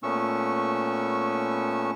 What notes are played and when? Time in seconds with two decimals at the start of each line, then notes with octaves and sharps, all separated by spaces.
0.03 A#2 A3 B3 C#4 C#6 E6